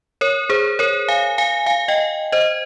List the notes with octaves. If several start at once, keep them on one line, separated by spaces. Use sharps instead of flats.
A#4 C#5
G#4 C5
A#4 C#5
F5 G#5
F5 G#5
F5 G#5
D#5 G5
C5 D#5